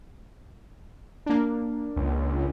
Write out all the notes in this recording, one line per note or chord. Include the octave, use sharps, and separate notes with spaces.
A#3 D4
C#2